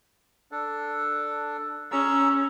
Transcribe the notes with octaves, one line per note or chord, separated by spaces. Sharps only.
D4 A4
C#4 G#4 A#5 E6